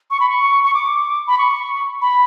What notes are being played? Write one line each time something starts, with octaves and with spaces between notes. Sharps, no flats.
C#6
B5
C#6
C#6
D6
B5
C#6
B5